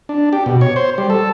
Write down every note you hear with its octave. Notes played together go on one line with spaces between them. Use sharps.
D4
G4
B2
C#5
C5
G3
A4